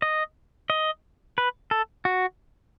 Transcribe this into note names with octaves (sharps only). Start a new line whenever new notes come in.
D#5
D#5
B4
A4
F#4